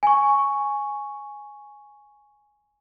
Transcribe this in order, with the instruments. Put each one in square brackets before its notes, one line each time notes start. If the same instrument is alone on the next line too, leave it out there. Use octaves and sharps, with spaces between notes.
[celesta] G#5 C#6